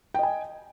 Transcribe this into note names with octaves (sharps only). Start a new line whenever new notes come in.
D#5 G5 G#5